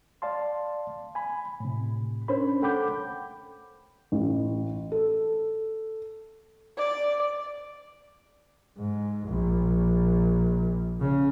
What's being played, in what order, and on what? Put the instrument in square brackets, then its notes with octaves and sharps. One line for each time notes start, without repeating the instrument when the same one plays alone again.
[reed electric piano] D5 F5 A5 C6
G#5 B5
A2 C3
C#4 D4 A#4 C5 C#5 B5
A4 F#5 G5 B5 D6 G6
[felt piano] A1
A4
[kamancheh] D5
[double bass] G#2
A#1
C#3